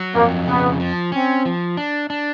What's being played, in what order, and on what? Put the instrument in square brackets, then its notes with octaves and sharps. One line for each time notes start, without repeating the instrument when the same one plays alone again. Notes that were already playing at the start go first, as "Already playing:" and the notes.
Already playing: [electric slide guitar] F#3
[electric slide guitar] F2 [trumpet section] A#3
[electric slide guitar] C#3 [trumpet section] B3
[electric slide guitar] F3
[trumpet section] C4 [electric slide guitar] C#4
[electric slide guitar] F3
D4
D4